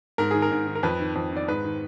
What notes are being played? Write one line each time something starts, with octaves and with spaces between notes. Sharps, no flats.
G#2 A#4
D#3 G#4
A#4
G#2
D#3
A#4
F2 B4
D#3
F2
D#3 D5
G#2 B4
D#3